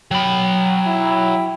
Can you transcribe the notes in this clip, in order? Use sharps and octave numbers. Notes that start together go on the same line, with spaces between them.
F#3 G5 B5
E4